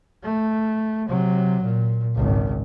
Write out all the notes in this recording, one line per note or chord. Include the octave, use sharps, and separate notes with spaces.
A3
C3 F#3
A#2
G#1 C#2